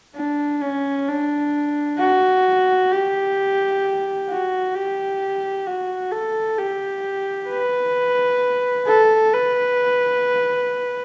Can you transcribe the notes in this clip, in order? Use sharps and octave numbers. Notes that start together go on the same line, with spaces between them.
D4
C#4
D4
F#4
G4
F#4
G4
F#4
A4
G4
B4
A4
B4